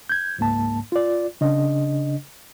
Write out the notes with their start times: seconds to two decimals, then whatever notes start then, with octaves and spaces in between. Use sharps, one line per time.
0.09 G6 G#6
0.39 C#2 G#2 A#3 A5
0.92 F4 D5
1.41 C#3 D4 D#5